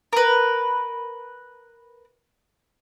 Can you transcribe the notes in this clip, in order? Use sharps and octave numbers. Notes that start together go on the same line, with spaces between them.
A#4 B4